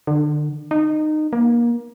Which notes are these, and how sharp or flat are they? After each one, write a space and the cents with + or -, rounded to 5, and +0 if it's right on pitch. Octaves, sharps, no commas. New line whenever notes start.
D3 +30
D#4 -20
A#3 +25